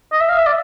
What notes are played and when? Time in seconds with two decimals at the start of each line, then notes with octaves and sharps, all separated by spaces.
0.12 D#5
0.21 E5
0.29 F5
0.38 E5
0.46 D5